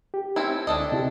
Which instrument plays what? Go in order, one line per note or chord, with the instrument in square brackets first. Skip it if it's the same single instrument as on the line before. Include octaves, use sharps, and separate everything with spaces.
[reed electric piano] G4
[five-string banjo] C4 C#4 E4
[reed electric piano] D2 [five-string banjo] D4 A4 D#5
[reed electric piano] C3 E4 G4